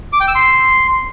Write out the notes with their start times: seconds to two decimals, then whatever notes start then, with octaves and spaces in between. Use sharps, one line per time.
0.13 D6
0.20 G5
0.28 E6
0.35 C6